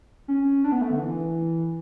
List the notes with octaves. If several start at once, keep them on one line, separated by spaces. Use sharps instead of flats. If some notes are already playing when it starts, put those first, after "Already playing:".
C#4
D4
B3
A3
D3
E3